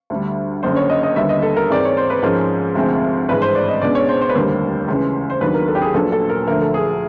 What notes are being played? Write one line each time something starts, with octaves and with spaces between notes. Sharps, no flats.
D2 D3 G3
F#1 F#2 D3 C5
C#5
D#5
D#5
D#2 D3 G3 B3 E5
D#5
A4
A#4
G#2 E3 G#3 C4 D5
C#5
C5
B4
G#2 F3 G#3 C#4 A#4
D2 C3 F3 G#3 C4
G#1 G2 E3 G#3 B4
C5
D5
D#5
C#2 B2 G#3 B3 D4 D5
C#5
C5
C5
B4
F1 D#2 D3 G3 A#3 C5
C#2 C#3 E3
C5
D#2 D#3 F#3 B3 D4 B4
A#4
A4
G4
G#4
A#1 A#2 F#3 B3 D4 A4
A4
A#4
D2 D3 F3 A3 A#4
A4
G#4